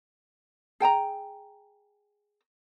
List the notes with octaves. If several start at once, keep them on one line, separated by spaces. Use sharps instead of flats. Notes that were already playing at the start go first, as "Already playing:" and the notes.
G#4 G5 A5 A#5